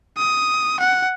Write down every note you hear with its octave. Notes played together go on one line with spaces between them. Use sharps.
D#6
F#5